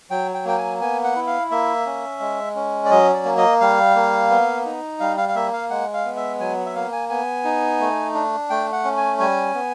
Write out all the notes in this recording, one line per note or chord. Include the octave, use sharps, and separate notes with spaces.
F#3 G5
G5
A#3 G5
G#5
B3 G#5
F#5
E4
F5
A#3 E5
C#4
G#3
C#4
D5
F#3 D#5
D5
A#3
D#5
G3 F5
A#3
B3
D#4
G3 F5
F5
F5
A#3 E5
F5
G#3 F#5
F5
B3
E5
F#3 G#5
E5
A#3 F5
G#5
B3 G#5
D#4
A3
D4
A3 G5
F#5
C#4
G#5
G3 G#5
B3